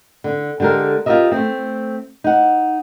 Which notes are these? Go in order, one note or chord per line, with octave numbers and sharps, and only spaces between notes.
D3
D3 G#3 G4 A4 A#4
F4 G4 A4 A#4 D#5 E5
A3 C4
D#4 F#5